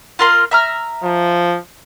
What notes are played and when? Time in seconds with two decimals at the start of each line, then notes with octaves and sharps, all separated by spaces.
0.19 F4 A#4 C6
0.51 E5 A#5 F6
1.03 F3